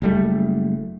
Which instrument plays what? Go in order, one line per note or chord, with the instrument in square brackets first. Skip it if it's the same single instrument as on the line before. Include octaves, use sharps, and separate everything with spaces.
[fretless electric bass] F#1 G3 A3